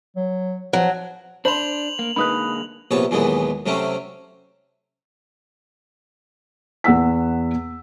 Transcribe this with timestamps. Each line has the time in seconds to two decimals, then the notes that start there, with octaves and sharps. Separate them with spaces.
0.17 F#3
0.73 F3 F#3
1.45 D4 C5 B5 C6 F7 F#7
1.99 A#3
2.16 D3 G#3 A#3 D#4 B4 B5 D#6 F#6
2.91 A#1 C3 B3 C#5 A5
3.11 D#2 A#2 E3 F#3 G#3 B3
3.66 C3 F#3 A3 C4 C#4
6.84 E2 F#5 E6 B6